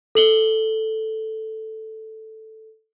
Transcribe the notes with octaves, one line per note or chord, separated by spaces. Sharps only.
A4 F#7 G7